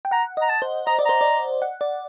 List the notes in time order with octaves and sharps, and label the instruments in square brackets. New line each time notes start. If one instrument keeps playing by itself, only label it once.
[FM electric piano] G5
[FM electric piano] F#5 [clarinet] A#5
[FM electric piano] D#5 [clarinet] A#5
[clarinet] A5
[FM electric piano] C5
[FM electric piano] D#5 [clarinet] A#5
[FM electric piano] D5
[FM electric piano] C5 [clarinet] A#5
[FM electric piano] D5
F#5
D5